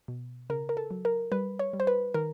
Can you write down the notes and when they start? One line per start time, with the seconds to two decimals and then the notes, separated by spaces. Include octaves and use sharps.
0.08 B2
0.50 C#3 A#4
0.69 A#4
0.77 A4
0.91 F#3
1.05 A#4
1.32 G3 B4
1.59 C#5
1.73 G3
1.80 C5
1.87 B4
2.14 D#3 A#4